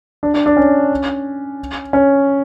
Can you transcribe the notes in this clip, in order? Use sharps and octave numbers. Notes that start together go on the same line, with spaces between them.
D4
D4
D4
C#4
C#4